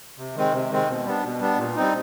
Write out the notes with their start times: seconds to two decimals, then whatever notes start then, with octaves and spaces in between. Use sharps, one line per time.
0.18 C3
0.36 D#3 G#3 C4
0.53 C3
0.71 D#3 G#3 C4
0.89 B2
1.06 G3 B3 D4
1.23 B2
1.41 G3 B3 D4
1.58 A#2
1.76 G3 C4 D#4